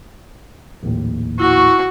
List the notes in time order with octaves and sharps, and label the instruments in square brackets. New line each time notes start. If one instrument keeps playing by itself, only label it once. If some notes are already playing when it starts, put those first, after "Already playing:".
[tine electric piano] A#1 D#2 A2
[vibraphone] E4 C#6 [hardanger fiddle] F#4